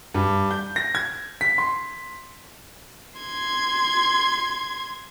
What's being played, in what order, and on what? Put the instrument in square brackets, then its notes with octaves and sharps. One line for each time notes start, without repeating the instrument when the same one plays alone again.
[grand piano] G2
G6
A#6
G#6
B6
C6
[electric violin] C6 G#6